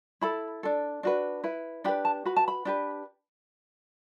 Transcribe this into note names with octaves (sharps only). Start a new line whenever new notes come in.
E4 A4 B5
D4 A4
D4 F#4 B4
E4 B4
D4 G4 B4 B5
A5
F#4 B4 B5
A5
B5
D4 G4 B4